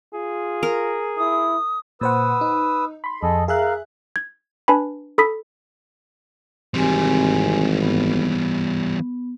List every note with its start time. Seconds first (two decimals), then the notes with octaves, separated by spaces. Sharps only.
0.13 F4 G#4
0.63 A#4
1.18 E4 D#6
2.01 A#2 B4 C5 F#5 D#6 E6
2.41 D#4
3.04 B5 C6
3.23 F2 G#4 A4 D#5
3.48 G#4 A#4 E5 F5 F#6
4.16 G#6
4.68 D4 B4 G#5 A5 B5
5.18 A4 B5 D#6 B6
6.74 G#1 E3 G3 C4 G4 G#5
7.82 B3